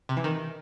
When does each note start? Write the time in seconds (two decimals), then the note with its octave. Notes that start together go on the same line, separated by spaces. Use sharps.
0.09 C3
0.17 E3
0.24 D#3